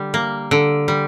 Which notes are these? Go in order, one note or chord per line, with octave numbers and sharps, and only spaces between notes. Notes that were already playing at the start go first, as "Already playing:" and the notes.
Already playing: D3 G3
A#3
D3
G3